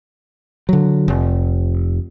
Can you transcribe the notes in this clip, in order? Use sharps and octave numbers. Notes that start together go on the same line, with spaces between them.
D3 F#3
F1